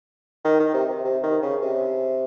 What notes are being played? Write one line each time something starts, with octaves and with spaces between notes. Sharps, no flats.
D#3
D#3
C3
C3
C3
D#3
C#3
C3